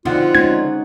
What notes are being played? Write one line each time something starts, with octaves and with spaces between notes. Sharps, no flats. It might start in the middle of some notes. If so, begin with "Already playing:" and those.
D3 F3 C4 D#4 F4 F#5
G#3 C#4 D#4 G#6